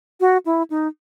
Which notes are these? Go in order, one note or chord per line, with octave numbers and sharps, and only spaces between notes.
F#4
E4
D#4